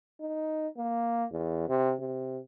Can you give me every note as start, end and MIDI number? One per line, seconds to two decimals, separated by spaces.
0.20 0.68 63
0.77 1.24 58
1.31 1.64 40
1.69 1.94 48
2.00 2.39 48